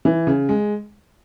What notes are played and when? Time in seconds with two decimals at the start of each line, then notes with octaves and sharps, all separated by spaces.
0.05 E3
0.27 C#3
0.49 G#3